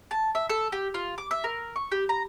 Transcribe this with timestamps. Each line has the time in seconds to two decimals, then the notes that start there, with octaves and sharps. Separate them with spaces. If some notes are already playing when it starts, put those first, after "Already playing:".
0.11 A5
0.35 E5
0.49 A4
0.72 G4
0.94 F4
1.18 D6
1.31 E5
1.44 A#4
1.76 C#6
1.92 G4
2.09 A#5